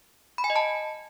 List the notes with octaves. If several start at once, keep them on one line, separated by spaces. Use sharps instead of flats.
B5
G#5
D#5
A5